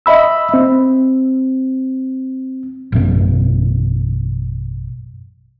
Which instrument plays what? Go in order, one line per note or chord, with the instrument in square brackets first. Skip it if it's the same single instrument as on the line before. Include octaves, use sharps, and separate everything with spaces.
[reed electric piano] D#5 E5 B5 E6
C4
[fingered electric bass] A1 F#2 B2